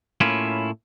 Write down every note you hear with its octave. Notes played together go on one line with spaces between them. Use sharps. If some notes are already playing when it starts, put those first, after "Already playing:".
A2 A#3 C#4 E4 F4